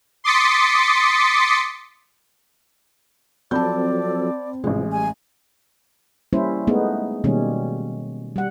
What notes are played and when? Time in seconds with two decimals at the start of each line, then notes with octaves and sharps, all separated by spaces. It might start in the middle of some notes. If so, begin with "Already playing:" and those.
0.24 C6 D6 D#6 A6 B6 C#7
3.51 F3 F#3 C4 A4 D5 A5 B5 G6
4.64 A1 C3 E3 F3 G#3
4.92 G3 G#5
6.33 G3 A#3 C#4 E4 C5
6.67 G#3 A3 B3 D#4 G#4
7.24 B2 D#3 G3 G#3 A#3 C#4
8.36 G3 F#5